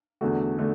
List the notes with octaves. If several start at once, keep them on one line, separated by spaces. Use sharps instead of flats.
E2 D3 A3 F#4
D3 A3 A4